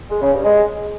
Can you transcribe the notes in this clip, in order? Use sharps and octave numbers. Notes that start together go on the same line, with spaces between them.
G#3
C#3
G2
G#3